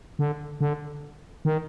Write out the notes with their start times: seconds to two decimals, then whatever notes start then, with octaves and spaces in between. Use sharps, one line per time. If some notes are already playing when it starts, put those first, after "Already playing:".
0.19 D3
0.61 D3
1.45 D#3